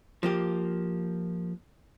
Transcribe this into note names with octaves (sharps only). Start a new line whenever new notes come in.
F3 A#3 G4